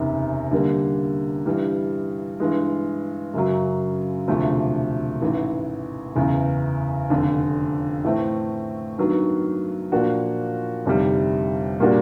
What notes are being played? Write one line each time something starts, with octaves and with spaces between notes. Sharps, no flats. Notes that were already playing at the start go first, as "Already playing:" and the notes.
Already playing: F#1 E2 C3 D#3
D3 G3 A#3
G2 E3 G3
G2 E3 G#3
F#2 C#3 F#3
E1 D2 C3 F3 A3
A1 G#2 E3
F#1 E2 C#3 E3
F1 F2 D3
A2 E3 A3 C4
G2 D#3 F#3 B3
A#2 F3 A#3 D4 F#4
G1 F2 C3 D#3 G3
A#2 G3 A#3 D4 F#4